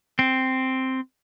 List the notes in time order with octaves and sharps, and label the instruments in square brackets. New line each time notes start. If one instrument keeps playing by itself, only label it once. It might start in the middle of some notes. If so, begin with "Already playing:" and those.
[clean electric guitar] C4